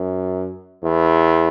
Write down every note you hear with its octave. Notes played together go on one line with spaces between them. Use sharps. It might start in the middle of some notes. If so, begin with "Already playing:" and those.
Already playing: F#2
E2